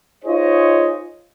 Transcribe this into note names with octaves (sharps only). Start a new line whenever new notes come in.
D#4 F4 G#4 C5 C#5 D#5